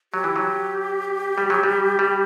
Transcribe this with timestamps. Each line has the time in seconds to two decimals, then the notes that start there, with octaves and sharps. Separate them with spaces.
0.13 F#3 G4
0.24 E3
0.36 F#3
1.38 G3
1.50 F#3
1.63 G3
1.99 G3